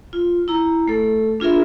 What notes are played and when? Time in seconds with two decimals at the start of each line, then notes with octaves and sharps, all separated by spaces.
0.13 F4
0.48 E4 A#5
0.88 A3 A4
1.40 D4 F4 G#4 A#4 E5